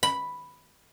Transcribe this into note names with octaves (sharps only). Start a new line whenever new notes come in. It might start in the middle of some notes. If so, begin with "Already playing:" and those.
B5